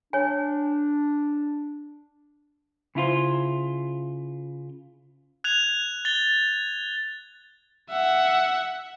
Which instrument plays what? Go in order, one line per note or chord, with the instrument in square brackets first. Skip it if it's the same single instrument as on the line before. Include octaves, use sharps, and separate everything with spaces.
[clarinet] D4 [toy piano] C#5 G#5
[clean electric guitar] C#3 E4 F4 C5
[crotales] F#6 G#6 F7
A6 G7
[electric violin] E5 F#5